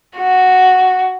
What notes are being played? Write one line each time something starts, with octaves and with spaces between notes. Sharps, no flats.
F#4